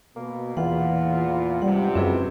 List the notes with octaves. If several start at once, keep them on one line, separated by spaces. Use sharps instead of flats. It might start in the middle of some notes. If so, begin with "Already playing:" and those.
B2 A#3
E2 A#2 E3 F4 F#5
C#2 G2 C3 G3 F#5
F#2 B2 C4 E4 G#4